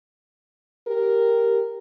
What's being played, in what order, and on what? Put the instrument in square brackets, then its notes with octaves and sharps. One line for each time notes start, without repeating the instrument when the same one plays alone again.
[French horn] G4 [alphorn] A#4